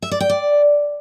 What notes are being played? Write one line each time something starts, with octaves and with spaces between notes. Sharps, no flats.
E5
D5
G5
D5